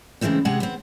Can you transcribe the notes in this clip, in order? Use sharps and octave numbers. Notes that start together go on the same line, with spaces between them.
C#3 E3 G#3 A3 C4
C3 G#3 G#4 F#5
B3 C4